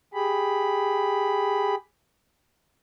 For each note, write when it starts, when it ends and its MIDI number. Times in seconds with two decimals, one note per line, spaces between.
0.14 1.75 67
0.14 1.75 68
0.14 1.75 83